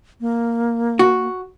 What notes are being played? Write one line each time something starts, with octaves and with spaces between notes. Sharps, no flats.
A#3
F#4